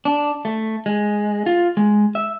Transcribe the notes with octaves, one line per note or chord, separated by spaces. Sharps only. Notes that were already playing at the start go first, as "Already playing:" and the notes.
D4
A3
G#3
F4
G#3
E5